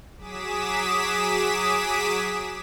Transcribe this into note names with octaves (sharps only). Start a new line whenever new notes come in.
F#3 G#4 D6 D#6 B6 E7